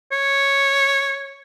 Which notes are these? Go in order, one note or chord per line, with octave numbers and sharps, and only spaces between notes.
C#5